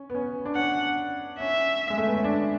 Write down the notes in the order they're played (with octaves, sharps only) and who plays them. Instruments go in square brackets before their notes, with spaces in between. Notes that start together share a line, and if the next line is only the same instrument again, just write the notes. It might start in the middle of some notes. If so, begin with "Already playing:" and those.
Already playing: [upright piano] C#4
B3
C#4
D4
[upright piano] C#4 [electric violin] F#5
[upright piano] C#4 [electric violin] E5
[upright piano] G#3
A3
B3
C#4
D4